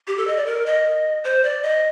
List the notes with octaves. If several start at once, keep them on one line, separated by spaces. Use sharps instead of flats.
G4
A4
D#5
D5
A#4
D#5
C5
D5
D#5